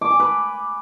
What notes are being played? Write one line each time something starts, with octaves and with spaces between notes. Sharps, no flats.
D6
G#5
B4